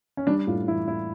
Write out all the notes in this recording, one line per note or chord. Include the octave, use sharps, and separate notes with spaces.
C#4
G3 D4
A2 F4
E3 E4
A2 E4